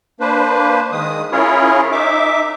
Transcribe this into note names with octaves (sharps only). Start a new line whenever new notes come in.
A#3 D4 B4 C5
D#3 G#3 D#6
C#4 E4 F4 G#4 A#4 C#5
D#4 E5 D6